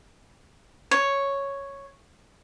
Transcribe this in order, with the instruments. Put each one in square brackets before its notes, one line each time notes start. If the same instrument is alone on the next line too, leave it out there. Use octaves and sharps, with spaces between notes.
[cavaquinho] C#5